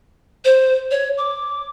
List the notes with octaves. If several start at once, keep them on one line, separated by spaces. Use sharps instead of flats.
C5
C#5
D6